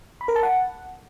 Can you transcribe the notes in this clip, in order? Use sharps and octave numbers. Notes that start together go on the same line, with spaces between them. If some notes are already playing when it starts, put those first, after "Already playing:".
B5
A#4
A5
F#5